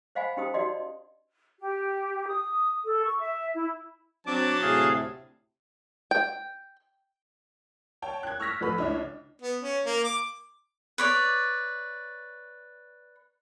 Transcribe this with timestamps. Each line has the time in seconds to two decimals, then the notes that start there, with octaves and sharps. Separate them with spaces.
0.15 C5 D#5 F5 F#5 G#5 B5
0.37 C#4 D#4 G4 C5 A5 D#6
0.54 D#4 F#4 G4 D5 D#5 C6
1.59 G4
2.28 D#6
2.85 A4
3.04 C#6
3.19 E5
3.54 E4
4.27 F#3 C4 D4 A5 D6
4.61 D2 A2 C3 G#4 F5
6.11 G5
8.02 C#5 G5 A5
8.23 F#6 G#6
8.40 C#6 E6 F6 A#6 B6
8.60 A1 F3 A4 B4 B5 E6
8.78 C#2 D4 E4 C#5
9.42 B3
9.62 C#4
9.85 A#3
10.04 D6
10.98 B4 C#5 D5